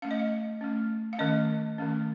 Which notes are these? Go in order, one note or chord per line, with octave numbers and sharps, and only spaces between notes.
A3 C#4 F5
D#5
F5
A3 C#4
F5
D#3 A3 C#4 D#5
D#3 A3 C#4